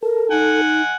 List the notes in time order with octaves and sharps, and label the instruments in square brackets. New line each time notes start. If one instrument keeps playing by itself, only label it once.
[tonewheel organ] A4 [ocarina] A#4
[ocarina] D#4 [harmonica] F#5 G#5